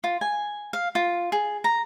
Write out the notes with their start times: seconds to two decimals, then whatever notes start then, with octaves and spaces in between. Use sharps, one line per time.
0.04 F4
0.21 G#5
0.73 F5
0.95 F4
1.32 G#4
1.64 A#5